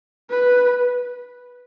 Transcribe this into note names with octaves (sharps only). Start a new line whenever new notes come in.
B4